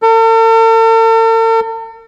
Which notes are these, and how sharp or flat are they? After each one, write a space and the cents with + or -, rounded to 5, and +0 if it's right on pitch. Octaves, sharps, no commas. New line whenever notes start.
A4 +45